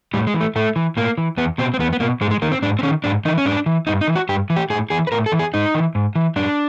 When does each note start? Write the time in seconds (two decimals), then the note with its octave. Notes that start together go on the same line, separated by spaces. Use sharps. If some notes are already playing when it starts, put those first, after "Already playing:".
0.14 A2 G3
0.27 G#3
0.34 E3
0.41 A3
0.56 A2 A3
0.76 E3
0.97 A2 A#3
1.18 E3
1.37 E2 B3
1.58 B2 C4
1.74 C4
1.79 E2 B3
1.93 B3
2.00 B2 A#3
2.21 G#2 G#3
2.31 G#3
2.42 D#3 A#3
2.52 C4
2.62 G#2 D4
2.79 C4
2.83 D#3 C#4
3.04 G#2 D4
3.25 E3 D#4
3.38 C#4
3.46 G#2 D4
3.66 E3
3.87 G2 D#4
4.01 D#4
4.07 E3
4.15 F#4
4.29 G2 G4
4.50 E3
4.56 G4
4.70 A2 G#4
4.90 E3 G#4
5.07 B4
5.12 A2 A#4
5.26 A4
5.32 E3
5.39 G#4
5.54 G#2 D#4
5.74 E3
5.95 G#2
6.16 E3
6.36 F#2 D4